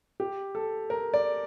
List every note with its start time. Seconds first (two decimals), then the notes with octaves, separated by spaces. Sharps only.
0.20 G4
0.55 A4
0.90 A#4
1.14 D5